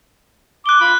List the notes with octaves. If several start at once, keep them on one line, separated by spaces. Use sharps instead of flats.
D6 F#6 G7
F4 B5